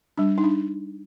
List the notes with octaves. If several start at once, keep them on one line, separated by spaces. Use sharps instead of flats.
G3 D4
D#4
D4